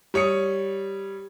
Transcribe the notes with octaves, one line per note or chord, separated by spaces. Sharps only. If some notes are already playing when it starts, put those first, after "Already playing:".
G3 C#5 D#6 C#7